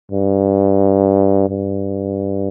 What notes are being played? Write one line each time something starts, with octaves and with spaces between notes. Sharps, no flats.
G2
G2